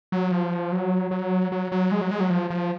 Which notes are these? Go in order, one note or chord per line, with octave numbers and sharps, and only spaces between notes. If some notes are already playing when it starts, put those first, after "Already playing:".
F#3
F3
F#3
F#3
F#3
F#3
G#3
F#3
G#3
F#3
F3
F3